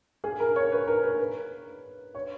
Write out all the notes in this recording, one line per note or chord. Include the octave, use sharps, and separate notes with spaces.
G#4
A#4
C#5
B4
A#4
B4
C#5